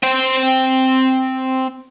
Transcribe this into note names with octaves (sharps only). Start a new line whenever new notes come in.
C4 G5